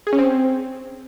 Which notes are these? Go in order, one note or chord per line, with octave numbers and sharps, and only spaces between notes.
G#4
C#4
C4